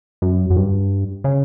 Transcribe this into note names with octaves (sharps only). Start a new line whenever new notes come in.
F#2
F#2
G2
C#3